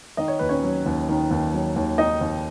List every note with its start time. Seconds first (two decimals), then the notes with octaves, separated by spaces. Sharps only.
0.17 D#3 D#5
0.28 C#5
0.39 D#2 B4
0.49 C#4 C#5
0.64 F#3
0.86 D#2
1.09 D#3
1.31 D#2
1.54 F#3
1.76 D#2
1.98 D#3 D#4 D#5
2.21 D#2